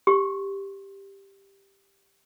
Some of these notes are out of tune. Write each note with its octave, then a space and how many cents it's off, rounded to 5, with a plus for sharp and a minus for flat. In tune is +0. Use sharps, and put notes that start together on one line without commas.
G4 +5 C6 +30